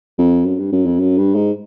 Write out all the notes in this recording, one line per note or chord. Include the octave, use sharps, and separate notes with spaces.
F2
F#2
G2
F#2
F2
F#2
G2
G#2